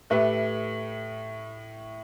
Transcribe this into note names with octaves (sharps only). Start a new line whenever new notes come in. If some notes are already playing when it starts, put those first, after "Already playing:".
A2 A3 G4 B4 E5